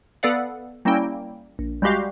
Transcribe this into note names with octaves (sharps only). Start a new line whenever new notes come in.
B3 A4 B4 D5 F5 F#5
G3 A#3 C#4 E4 G5
A#1
G3 G#3 F#4 G4 F5